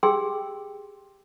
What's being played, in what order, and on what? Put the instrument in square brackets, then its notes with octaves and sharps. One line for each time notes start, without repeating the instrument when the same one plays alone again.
[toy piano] G4 G#4 G5 C6 E6